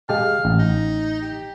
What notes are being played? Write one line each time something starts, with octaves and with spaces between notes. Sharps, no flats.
G#3 G4 F5 A5
A1
D#4
G4